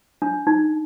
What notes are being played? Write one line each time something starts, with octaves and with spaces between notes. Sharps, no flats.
D4
D#4